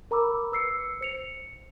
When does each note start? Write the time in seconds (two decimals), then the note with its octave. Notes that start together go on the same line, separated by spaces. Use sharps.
0.11 A#4 A#5 B5 D6 E6
0.52 B4 E6 C7 C#7
1.01 C5 C#7 F7